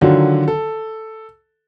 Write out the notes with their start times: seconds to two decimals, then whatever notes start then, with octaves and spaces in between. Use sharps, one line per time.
0.01 D3 D#3 F#3 D4 F4 F#4
0.48 A4